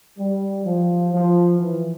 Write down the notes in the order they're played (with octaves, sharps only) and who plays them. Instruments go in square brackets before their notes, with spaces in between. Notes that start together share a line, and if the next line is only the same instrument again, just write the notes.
[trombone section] G3
F3
F3
E3